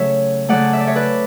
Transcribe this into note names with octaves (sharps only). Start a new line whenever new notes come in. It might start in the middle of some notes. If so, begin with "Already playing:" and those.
Already playing: C#3 F#3 A3 C#5 E5
C#3 F#3 A3 D5 F#5
E5
D5
C#5 E5
B4 D5